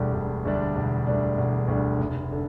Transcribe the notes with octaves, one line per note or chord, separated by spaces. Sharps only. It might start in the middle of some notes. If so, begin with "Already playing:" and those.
Already playing: E1 D2 D3 G3 D4
E1
D2 D3 G3 D4
E1
D2 D3 G3 D4
E1
D2 D3 G3 D4
F1
D3